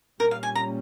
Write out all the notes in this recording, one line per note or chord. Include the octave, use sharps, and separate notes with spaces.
A#2 G3 A#3 C#4 A#4
F5
G#5
A#5